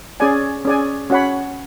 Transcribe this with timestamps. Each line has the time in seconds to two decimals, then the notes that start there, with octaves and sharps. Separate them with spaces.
0.20 C#4 G#4 D5 G#5
0.65 C#4 G#4 D5 G#5
1.10 C#4 F#4 C#5 F#5 B5